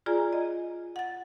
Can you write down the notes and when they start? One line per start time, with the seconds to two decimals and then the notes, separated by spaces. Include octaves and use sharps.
0.06 F4 G#4 D5 G#5 A#5
0.33 D#5
0.96 F#5 A6